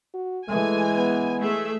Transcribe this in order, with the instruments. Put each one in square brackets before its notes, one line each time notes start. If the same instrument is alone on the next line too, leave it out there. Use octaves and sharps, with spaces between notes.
[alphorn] F#4
[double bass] E3 G#3 [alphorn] A3 [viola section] G#5
[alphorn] B3
[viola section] A3 G#4 E5